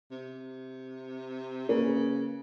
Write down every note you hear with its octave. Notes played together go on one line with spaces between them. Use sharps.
C3
C#3 A#3 A#4 B4